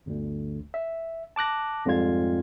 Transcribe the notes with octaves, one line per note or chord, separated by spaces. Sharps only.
G1 D2
E5
A5 D6 F#6 A#6
F2 G#2 G3 F4 G#6